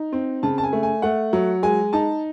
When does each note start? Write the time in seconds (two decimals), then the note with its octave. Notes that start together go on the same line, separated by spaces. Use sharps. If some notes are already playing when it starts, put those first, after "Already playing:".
Already playing: D#4
0.13 C4
0.43 C#3 A5
0.58 A5
0.63 G#5
0.73 A3
0.83 G#5
1.02 A3 F#5
1.33 F#3
1.63 G#3 G#5
1.93 D#4 A5